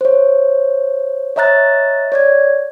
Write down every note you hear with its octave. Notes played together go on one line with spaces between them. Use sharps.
C5 C#5
C#5 D#5 E5 A#5 F#6 A6
C#5 D5 G#6